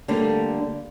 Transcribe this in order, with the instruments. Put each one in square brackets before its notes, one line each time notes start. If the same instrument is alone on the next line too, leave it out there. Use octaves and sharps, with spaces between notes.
[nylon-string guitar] D3 G3 A3 A#3 D4